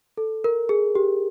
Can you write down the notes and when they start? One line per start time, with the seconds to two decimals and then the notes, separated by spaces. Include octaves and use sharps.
0.17 A4
0.44 A#4
0.69 G#4
0.95 G4